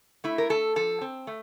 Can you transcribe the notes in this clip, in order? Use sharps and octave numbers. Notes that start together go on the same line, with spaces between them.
A3 E4
A#4
A3 A4
F3 A4
C4
A3